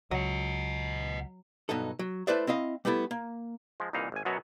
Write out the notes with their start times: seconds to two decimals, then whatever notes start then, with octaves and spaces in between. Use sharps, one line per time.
0.11 C#2 F#3 D#5 F#5
1.69 G2 B2 F#3 D#4 A4
1.99 F#3
2.27 A3 E4 B4 C5 D5 E5
2.47 C4 E4 D#5 F5
2.85 G3 A3 B3 E4 A4
3.11 A#3
3.80 F3 G#3
3.93 C2 A#2 E3 D#4 F5
4.12 G#1 G#5
4.25 F#2 B2 F#3 B3 F#4 C#5